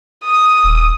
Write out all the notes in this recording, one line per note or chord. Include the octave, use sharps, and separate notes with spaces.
D#6
D#1